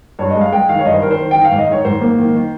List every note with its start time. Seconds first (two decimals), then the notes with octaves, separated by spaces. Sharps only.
0.19 G2 C#5
0.30 D#5
0.35 G#3
0.41 F5
0.52 G#3 G5
0.69 D#3 F5
0.79 C#5
0.85 G2 D#5
0.94 C5
1.02 D#3 A#4
1.11 C5
1.19 D#3
1.31 D#3 G5
1.44 F5
1.51 G#2
1.58 D#5
1.68 D#3 C#5
1.85 G#2 C5
2.01 A#3
2.19 D#3
2.35 D#3